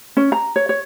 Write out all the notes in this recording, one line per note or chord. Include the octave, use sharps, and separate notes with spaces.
C#4
A#5
C#5
C#5